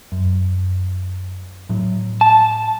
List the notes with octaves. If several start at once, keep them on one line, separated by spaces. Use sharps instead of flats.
F#2
A2 F#3
A5